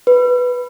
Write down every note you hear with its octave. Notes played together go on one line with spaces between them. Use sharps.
B4